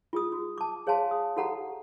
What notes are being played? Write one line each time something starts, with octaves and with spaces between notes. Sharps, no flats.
F4 G#4 D#6
F#4
A5 D6
G#4 C#5 F5 G#5 A5 C6
D#6
F#4 G4 A4 F#5 A#5